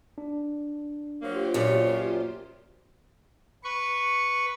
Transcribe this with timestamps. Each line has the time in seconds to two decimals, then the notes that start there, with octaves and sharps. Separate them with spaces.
0.18 D4
1.22 F3 F#3 A#3 F4 G4 C5
1.54 F#2 A#2 C#5
3.64 B4 C#6